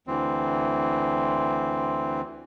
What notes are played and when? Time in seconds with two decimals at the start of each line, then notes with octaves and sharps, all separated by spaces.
0.07 D2 E3 C4